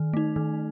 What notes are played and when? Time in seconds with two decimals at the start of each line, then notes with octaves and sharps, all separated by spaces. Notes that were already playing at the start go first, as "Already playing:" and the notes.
Already playing: D#3
0.13 A3 D#4
0.36 D#3